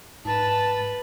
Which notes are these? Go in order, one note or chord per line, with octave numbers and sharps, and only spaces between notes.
G#2 B4 A5